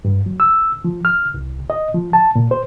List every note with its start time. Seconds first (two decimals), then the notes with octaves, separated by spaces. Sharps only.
0.05 G2
0.26 F#3
0.40 E6
0.85 F3
1.05 F6
1.34 C2
1.70 D#5
1.95 F3
2.13 A5
2.35 A#2
2.51 C5